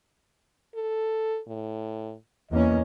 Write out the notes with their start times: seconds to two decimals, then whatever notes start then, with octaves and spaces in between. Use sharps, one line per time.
0.75 A4
1.47 A2
2.51 E2 A#3 C#4 D#5